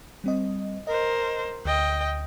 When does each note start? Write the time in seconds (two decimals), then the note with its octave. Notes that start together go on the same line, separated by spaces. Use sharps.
0.24 G3 C4 D#5
0.87 A#4 C5 D#5
1.65 D2 D#5 G5